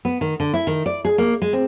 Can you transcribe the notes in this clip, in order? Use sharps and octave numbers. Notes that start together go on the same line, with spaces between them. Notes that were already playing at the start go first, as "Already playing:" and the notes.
B3
D#3
D3
E4
D#3
D5
G#4
A#3
G#3
C4